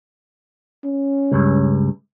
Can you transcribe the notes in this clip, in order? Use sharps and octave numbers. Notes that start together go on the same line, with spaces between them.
C#4
C#2 G2